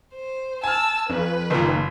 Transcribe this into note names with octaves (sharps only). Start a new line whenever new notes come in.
C5
G#5 A5 E6 F6
F2 B4
F#1 A#2 D#3